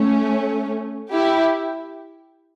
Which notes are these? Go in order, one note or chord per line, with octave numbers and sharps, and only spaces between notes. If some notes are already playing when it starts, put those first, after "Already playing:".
Already playing: A3 C#4
E4 G4